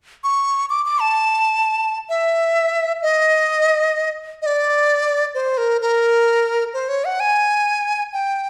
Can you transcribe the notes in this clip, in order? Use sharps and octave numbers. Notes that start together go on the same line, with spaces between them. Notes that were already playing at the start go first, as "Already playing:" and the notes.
C#6
D6
D6
A5
E5
D#5
D#5
D5
C5
A#4
A#4
C5
C#5
F#5
G#5
G5